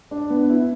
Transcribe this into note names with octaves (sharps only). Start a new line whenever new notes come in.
D4
B3
E4